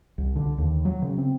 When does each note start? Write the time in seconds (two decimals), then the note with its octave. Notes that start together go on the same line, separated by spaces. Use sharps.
0.18 C2
0.36 D3
0.58 D#2
0.85 F#3
1.02 C#3
1.18 C4